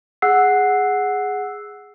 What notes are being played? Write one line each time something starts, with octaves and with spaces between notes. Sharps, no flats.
G#4 F#5 E6 F#6 C7